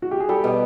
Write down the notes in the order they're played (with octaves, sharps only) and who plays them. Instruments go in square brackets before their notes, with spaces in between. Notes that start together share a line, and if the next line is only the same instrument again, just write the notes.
[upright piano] F#4
G4
G#4
[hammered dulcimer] G3 [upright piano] G4 A4
[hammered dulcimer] B2